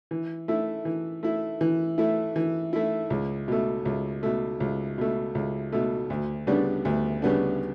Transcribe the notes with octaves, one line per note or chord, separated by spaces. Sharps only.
E3
A3 E4
E3
A3 E4
E3
A3 E4
E3
A3 E4
C#2
B2 A3
C#2
B2 A3
C#2
B2 A3
C#2
B2 A3
D2
C#3 G3 B3 D4
D2
C#3 G3 B3 D4